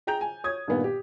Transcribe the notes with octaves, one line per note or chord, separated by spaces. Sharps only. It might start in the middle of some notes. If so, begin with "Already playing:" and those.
G#4 G5 A#5 G6 F7
G#5
C#5 D#6 G#6
G2 A#2 D#3 B3
G4